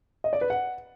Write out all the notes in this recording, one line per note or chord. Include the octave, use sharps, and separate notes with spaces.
D#5
D5
B4
F#5